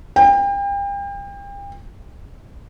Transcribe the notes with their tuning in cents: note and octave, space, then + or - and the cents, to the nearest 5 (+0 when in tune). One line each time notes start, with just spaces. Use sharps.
G5 +35